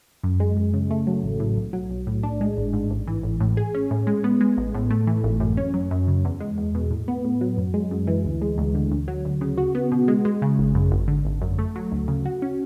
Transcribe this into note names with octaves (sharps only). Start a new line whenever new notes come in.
F#2
G#3
F#2
C#3
A3
F#3
A1
A2
B1
F#3
B1
A2
D4
G#3
G#1
G#2
A1
E3
A1
A2
G#4
C#4
A2
G#3
B3
G#3
A1
A2
A3
E3
G#1
F#2
C#4
F#3
F#2
C#3
E2
G#3
E2
B2
A2
B3
A2
F#3
F#2
G#3
F#2
E3
D2
G#3
D2
D3
D2
F#3
D2
C#3
F#4
B3
B2
G#3
G#3
C#3
G#1
F#2
G#1
D3
G#1
F#2
A3
F#3
D2
C#3
F#4
C#4